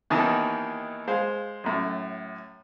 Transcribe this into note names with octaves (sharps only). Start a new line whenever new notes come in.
D#2 D#3 E3 B3 D#4 A5
G#3 C5 F5
F#2 A2